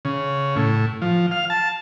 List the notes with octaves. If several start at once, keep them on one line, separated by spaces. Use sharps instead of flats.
C#3
A2
F3
F5
A5